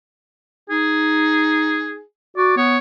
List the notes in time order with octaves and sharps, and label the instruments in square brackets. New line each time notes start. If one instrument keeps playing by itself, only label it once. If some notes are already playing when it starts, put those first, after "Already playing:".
[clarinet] D#4 [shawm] G#4
[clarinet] F#4 [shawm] D5
[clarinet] B3 [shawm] C#5